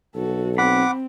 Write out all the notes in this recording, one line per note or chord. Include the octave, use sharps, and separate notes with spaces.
B1 F#4 A4
C4 F#5 B5 D6